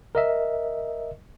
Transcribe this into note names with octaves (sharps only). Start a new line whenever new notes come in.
A#4 D#5 E5